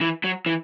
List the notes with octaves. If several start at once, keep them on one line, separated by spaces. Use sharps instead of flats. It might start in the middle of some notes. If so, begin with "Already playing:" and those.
E3
F#3
E3